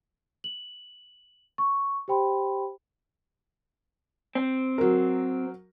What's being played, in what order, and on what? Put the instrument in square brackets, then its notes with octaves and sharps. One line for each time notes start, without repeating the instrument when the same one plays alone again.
[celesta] F#7
C#6
G4 C5 G5 B5 C6
[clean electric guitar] C4
[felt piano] F#3 A#4